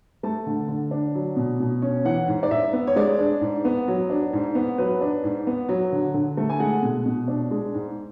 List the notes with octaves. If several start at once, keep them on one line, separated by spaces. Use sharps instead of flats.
A3 A5
D3
D3
D4
F#3
B2
B2
C#4
E3 F#5
G#2
D5
G#2 E5
B3
C#5
G#3 D5
D4
G#2
B3
F#3
D4
G#2
B3
F#3 B4
D4
G#2
B3
F#3
D3
D3
A3
G#5
G#3 F#5
B2
B2
D4
G#3
G#2